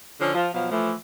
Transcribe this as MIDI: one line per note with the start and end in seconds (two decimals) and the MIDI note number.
0.20 0.32 50
0.20 0.32 53
0.20 0.32 61
0.33 0.47 53
0.33 0.47 65
0.54 0.68 47
0.54 0.68 53
0.54 0.68 54
0.54 0.68 77
0.71 0.92 52
0.71 0.92 53
0.71 0.92 57